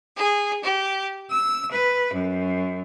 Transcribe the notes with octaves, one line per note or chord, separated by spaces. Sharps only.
G#4
G4
E6
B4
F#2